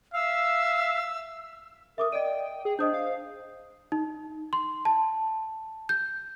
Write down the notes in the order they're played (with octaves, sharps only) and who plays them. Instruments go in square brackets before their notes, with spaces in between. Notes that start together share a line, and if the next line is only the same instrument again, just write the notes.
[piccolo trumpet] E5 [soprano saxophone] F5 [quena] E6
[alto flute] A#4 [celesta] E5 D6 D#6
[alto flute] D5 [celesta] D#5 D#7 [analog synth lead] G5
[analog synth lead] G#4 [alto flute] G5
[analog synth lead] D4 [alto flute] C5 [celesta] D#5 D#6 G6
[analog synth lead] F5
[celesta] D#4
C6
A5
G6